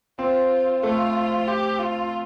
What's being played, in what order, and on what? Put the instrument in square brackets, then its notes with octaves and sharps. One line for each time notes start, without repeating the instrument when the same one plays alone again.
[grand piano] C4 [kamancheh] F4
[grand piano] A3 [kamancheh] F4
[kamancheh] G4
F4